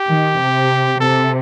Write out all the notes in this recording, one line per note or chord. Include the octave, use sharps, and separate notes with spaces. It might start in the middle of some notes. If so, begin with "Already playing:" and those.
Already playing: G4
D#3
C3
C3 A4